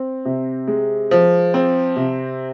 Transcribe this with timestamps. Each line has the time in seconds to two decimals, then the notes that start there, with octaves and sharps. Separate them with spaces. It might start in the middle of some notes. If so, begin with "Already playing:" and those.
Already playing: C4
0.25 C3
0.68 G#3
1.11 F3
1.54 C4
1.96 C3